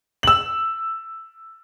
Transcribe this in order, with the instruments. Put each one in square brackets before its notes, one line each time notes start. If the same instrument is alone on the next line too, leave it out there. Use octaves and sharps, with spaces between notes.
[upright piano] E6 F#7